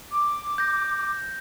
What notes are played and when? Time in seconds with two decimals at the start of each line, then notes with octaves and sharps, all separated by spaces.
0.11 D6
0.58 G6 A#6